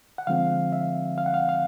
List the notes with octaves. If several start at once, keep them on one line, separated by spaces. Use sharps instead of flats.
F#5
D3 F3 G#3 C4 F5
E5
F5
F#5
F5
F5